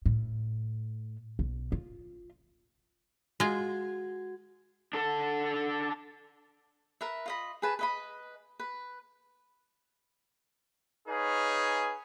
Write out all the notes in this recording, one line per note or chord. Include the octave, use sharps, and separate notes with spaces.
A2
B1
F4
G#3 F4 F#4 G#6
D4 A4
A#4 B4 E5
F4 D#5 B5
G#4 B4 A5
B4 D#5 B5
B4
D#4 G#4 B4 C#5 F5 G#5